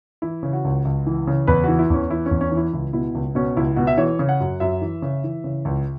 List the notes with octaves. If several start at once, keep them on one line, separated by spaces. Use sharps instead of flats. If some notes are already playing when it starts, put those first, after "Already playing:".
E3 E4
C#3
F#4
C#2
C#2
E3
C#3
E2 B4
E3 F#4
E4
E2 C#4
E3 E4
C#4
E2
C#4
E3
E4
C#2 E4
B2 E4
C#2
B2 C#4
C#2 E4
B2 F#4
E5
E3 C#5
C#3
F#5
F#2
F#2 E5
E3
C#3
E3
C#3
C#2